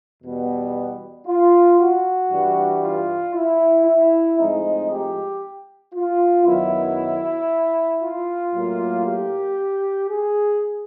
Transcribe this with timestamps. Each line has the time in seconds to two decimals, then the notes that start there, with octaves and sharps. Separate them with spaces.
0.23 E2 B2 G3 B3
1.27 F4
1.79 F#4
2.31 G2 E3 G3
2.82 F4
3.35 E4
3.86 E4
4.38 A2 F3 G#3 C4 D#4
4.90 G4
5.94 F4
6.46 F#2 D#3 F#3 B3 E4
8.02 F4
8.54 A2 F#3 A#3
9.06 G4
10.09 G#4